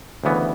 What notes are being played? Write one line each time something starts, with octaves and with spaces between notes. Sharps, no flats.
D2 C#3 E3 B3